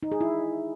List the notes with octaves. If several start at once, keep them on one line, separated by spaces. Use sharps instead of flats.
D#4
G#4
E4